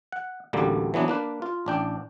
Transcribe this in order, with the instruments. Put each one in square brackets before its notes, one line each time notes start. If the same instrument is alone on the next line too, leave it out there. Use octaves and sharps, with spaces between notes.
[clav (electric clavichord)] F#5
A1 D2 D3 G3 A#3
E3 F#3 B3 D4
A#3 D4 B4
F4
A1 D4 G5